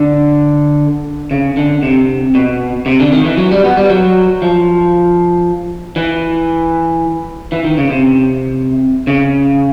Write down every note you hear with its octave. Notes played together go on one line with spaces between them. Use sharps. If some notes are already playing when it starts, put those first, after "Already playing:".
Already playing: D3
C#3
D3
C3
B2
C3
D3
D#3
E3
F#3
G3
B3
G3
F#3
F3
E3
E3
D#3
C#3
C3
C#3